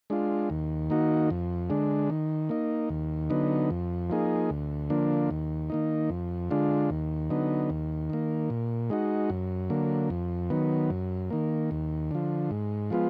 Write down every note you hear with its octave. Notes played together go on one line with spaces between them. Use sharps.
G#3 D4 F4
D#2
D#3 A#3 D#4 F#4
F2
D3 G#3 D4
D#3
A#3 D#4
D#2
D3 F#3 B3 D#4
F2
F3 A#3 D#4 G#4
D2
D3 F3 A#3 D4
D#2
D#3 A#3 D#4
F2
D3 G#3 D4 F4
D#2
D3 F#3 B3 D#4
D#2
D#3 A#3
A#2
G#3 D#4 F#4
F#2
D3 F#3 A#3
F2
D#3 F#3 B3
F#2
D#3 A#3
D#2
D3 F3
G#2
F3 G#3 B3 F4